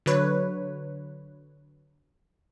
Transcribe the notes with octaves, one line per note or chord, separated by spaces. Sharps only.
D3 F#3 B4 C#5